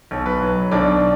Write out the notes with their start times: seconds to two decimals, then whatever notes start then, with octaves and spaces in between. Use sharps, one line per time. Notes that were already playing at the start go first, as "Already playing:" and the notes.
0.11 B1
0.26 B4
0.41 F#3
0.72 B1 D4 D5